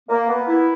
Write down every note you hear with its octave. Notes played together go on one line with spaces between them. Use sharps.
A#3
B3
E4